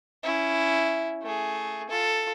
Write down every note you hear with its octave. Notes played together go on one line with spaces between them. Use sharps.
C#4 E4
A3 G#4
F4 A4